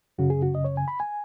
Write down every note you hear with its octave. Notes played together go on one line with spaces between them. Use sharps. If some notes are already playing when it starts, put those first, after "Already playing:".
F#2 C#3 F#4
G#4
F#4
D#5
C#5
G#5
B5
G#5